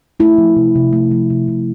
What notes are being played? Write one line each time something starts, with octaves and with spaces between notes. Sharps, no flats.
A3 E4
F3
C3
C3
A3
F3
C3
C3